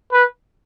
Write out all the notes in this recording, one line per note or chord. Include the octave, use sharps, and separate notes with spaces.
B4